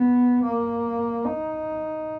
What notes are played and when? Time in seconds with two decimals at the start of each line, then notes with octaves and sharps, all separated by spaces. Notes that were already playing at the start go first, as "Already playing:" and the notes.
Already playing: B3
0.43 A#3
1.25 D#4